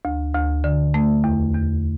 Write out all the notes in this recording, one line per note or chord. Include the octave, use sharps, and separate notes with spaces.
D2
D2
D3
A3
E2
E2